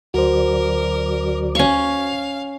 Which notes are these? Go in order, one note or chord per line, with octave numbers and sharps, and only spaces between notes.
D2 F#3 F#4 A#4 C5 D5
C#4 F5 C#6